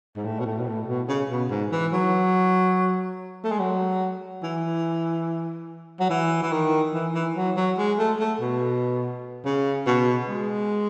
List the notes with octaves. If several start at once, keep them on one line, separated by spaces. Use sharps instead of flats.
G#2
A2
B2
A2
B2
A2
B2
C#3
B2
G#2
E3
F#3
A3
G#3
F#3
E3
F#3
E3
E3
D#3
E3
E3
F#3
F#3
G#3
A3
A3
B2
C#3
B2
G#3